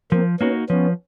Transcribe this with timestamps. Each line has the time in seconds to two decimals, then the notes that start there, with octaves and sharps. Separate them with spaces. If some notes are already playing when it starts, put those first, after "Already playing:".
0.12 F3 A#3 C4
0.40 A#3 B3 C#4 D#4 F#4
0.69 F3 B3 C#4